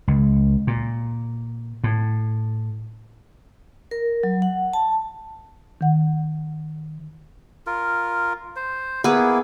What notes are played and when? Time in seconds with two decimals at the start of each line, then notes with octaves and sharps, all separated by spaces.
0.08 C#2
0.67 A#2
1.84 A2
3.91 A#4
4.23 F#3
4.42 F#5
4.73 A5
5.81 D#3 F#5
7.67 F4 A#4
8.56 C5
9.04 A#3 B3 E4 G#4